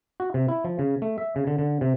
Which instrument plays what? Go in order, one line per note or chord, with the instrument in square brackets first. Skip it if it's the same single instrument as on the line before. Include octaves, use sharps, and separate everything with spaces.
[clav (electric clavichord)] F#4
C3
E4
F3
C#3
A3
E5
C#3
D3
D3
C3